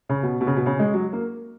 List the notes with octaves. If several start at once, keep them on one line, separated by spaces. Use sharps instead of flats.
C#3
B2
B2
C#3
B2
C#3
G#3
F#3
A#3